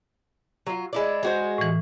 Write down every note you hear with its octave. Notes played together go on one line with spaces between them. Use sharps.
F#3 F4
G#3 E4 D5
G#3 F#4 C5
A2 E3